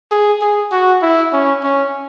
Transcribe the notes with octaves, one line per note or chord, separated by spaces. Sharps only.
G#4
G#4
F#4
E4
C#4
C#4